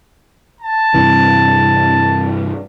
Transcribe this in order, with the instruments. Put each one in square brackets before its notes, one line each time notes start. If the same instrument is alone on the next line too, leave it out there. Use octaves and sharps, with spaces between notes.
[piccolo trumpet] A5
[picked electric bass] G2 C3 E3